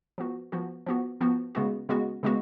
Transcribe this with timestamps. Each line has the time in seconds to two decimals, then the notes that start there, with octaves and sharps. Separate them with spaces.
0.18 F3 B3 F#4
0.52 F3 B3 F#4
0.86 F3 B3 F#4
1.21 F3 B3 F#4
1.55 C#3 G#3 B3 F#4
1.89 C#3 G#3 B3 F#4
2.23 C#3 G#3 B3 F#4